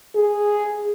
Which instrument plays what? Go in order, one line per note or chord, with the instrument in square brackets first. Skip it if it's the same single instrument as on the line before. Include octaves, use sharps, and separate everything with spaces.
[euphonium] G#4